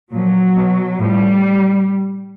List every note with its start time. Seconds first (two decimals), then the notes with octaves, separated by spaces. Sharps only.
0.12 A#2 F3 F#3
0.55 B2
0.97 A2 F3 G3